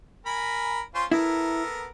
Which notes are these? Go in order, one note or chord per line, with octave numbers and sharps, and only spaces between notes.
A#4 G#5 B5
C#4 F4 C5
B3 E4 A4 A#4